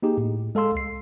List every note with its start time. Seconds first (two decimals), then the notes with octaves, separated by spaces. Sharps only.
0.02 A#3 D#4 G4 G#4
0.18 A2
0.55 G#3 A4 F5 C6 E6
0.75 C#2 C7